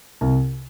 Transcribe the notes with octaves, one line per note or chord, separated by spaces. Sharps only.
C2